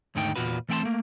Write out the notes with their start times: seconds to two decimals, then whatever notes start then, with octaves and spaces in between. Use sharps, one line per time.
0.15 D#2 G#2 D3 A3 D#4 G5
0.36 E2 A#2 F4 F#4 B4
0.69 E3 A3 C4 G5 A5 C6
0.83 A3 A#3